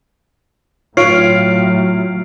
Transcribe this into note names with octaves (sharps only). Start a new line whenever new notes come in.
A2 F#3 F4 C#5 C7 D7